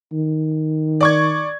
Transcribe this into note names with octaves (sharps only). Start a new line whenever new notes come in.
D#3
D5 C#6 G#6